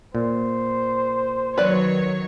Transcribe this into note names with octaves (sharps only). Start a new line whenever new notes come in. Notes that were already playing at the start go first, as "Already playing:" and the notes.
A#2 C5
D#3 F#3 B4 C#5 D5